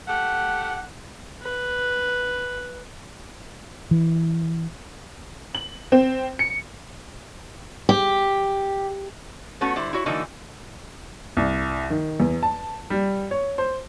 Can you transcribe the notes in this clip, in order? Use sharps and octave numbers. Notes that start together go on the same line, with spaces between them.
A3 G4 F#5
B4
E3
F#7
C4
C#7
G4
A3 B3 C#4 F#4 C#5
D3 G3 E4 C5
E4 F#4 C#5
D3 E3 F#3 A#3 D#4 A4
C2
D#3
E2
A5
G3
C#5
C5